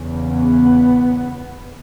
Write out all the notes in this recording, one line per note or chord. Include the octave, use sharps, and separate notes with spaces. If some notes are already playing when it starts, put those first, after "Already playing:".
Already playing: E2 C#3
B3